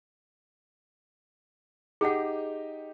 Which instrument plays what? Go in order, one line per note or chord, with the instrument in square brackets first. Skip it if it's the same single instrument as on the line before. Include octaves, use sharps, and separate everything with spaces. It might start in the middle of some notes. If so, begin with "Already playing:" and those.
[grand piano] D#4 G4 D#5 [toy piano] G#4 F#5